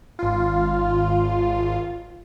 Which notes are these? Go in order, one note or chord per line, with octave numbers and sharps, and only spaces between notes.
G#1 F4